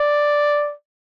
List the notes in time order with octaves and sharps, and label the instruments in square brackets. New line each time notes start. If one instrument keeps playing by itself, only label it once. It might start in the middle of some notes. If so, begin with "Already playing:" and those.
Already playing: [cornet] D5